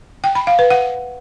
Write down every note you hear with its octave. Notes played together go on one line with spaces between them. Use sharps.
G5
B5
F5
B4
F#5